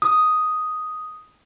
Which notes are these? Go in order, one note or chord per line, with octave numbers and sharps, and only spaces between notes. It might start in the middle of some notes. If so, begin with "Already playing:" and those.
D#6